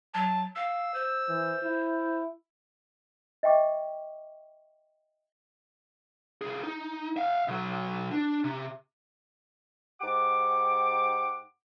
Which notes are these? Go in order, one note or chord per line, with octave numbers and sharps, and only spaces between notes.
F#3 A5
F5 E6
C5
E3
E4
D#5 E5 G5 C#6 D6
C2 G#4
D#4
E5 F5
B2 F#3
D4
C3
G#2 G4 F#5 D6